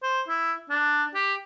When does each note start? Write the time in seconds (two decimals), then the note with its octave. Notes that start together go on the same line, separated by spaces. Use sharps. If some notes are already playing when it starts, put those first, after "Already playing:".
0.03 C5
0.28 E4
0.70 D4
1.14 G4